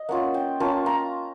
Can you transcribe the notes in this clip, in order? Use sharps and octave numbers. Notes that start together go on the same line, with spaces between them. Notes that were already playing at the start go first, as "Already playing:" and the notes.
Already playing: D#5
A#3 C#4 F4 F#5
G5
A#3 C#4 F4 A5
A#5